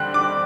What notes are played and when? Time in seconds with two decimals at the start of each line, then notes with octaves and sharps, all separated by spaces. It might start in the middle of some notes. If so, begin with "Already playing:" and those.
Already playing: D3 G3 C4 F#6
0.14 D6